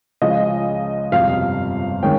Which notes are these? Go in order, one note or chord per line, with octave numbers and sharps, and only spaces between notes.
C#2 C#3 F3 G#3 D#5
G1 F2 C3 F5
D#3 G#3 C#4 G5